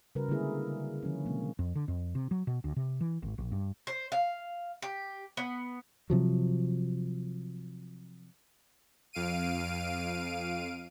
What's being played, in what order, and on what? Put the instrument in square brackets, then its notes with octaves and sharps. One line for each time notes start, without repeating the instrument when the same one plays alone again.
[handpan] C#3 G3 F#4 A#4 B4
D3 G3 G#3 A#3 E4 G#4
D3 D#3 F3 G#3 C#4
B2 F#3 G#3 A#3 C4
[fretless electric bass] F2
D3
F2
C3
F#3
B2
D2
C3
E3
G#1
A#1
G2
[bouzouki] C5
F5
G4
B3
[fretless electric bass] C3 F3 F#3
[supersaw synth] F2 F5 D7 D#7